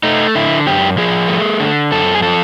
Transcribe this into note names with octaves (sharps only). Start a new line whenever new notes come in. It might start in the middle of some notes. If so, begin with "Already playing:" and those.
A3 D#4
D3 E4
F#2 G4
F3 G#4
A3
D3
F#2 A4
G#4
F3 A4